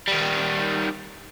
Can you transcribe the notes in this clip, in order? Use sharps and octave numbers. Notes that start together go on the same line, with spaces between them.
D#3 G3